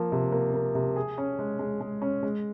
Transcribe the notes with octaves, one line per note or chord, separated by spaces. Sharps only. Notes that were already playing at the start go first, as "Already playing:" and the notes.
Already playing: F3 A#3
C3
A#3
A#3
C3
G#4
C#4
G#3
G#3
G#3
C#4
G#3